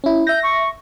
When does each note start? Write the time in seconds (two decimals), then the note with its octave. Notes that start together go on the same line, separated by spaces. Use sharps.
0.04 C#4 E4
0.27 E5 G6 A#6
0.43 C#6